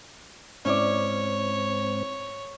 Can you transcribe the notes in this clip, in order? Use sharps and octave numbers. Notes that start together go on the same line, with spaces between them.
G#2 C4 C#4 E4 C#5 D5